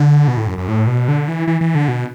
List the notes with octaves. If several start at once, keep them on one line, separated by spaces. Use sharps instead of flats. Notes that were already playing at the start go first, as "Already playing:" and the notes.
Already playing: D3
B2
A2
F#2
F#2
A2
B2
D3
E3
E3
E3
D3
B2